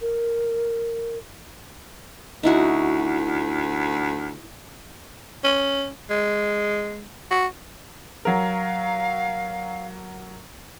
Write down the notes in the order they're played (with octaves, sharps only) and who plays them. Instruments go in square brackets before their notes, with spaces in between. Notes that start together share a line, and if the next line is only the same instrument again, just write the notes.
[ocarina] A#4
[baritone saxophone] D2 [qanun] D#4 E4 F#4
[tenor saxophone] C#4
G#3
F#4
[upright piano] F#3 A#4 [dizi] F5